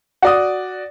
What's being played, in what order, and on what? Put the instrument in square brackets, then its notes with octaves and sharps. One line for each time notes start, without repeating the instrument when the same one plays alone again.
[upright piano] F#4 D5 D#6